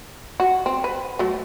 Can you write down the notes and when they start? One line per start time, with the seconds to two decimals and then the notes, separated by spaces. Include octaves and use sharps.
0.40 F#4
0.66 C4
0.84 B4
1.19 F#3 A3